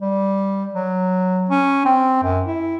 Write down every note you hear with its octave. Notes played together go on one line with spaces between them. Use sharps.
G3
F#3
C#4
C4
F#2
E4